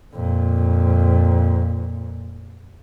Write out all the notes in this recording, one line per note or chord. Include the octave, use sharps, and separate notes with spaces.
F2 A#2